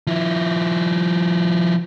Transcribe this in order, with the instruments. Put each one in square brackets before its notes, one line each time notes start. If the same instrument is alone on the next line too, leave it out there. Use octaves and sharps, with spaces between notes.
[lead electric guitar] F3 E4